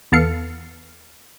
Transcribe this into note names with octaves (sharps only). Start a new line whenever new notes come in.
E2 B3 A4 F5 C#7